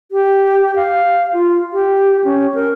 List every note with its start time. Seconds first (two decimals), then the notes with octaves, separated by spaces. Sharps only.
0.12 G4
0.76 F5
1.33 F4
1.73 G4
2.24 C#4
2.54 A#4